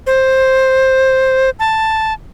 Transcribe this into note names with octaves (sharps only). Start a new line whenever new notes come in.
C5
A5